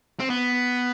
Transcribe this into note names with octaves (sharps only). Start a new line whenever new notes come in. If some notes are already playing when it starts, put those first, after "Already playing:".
C4
B3